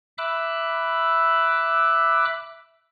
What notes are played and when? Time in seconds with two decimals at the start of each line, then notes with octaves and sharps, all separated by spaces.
0.18 E5 B5 D6 E6 F#6